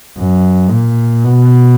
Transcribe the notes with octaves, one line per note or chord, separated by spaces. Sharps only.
F#2
A#2
B2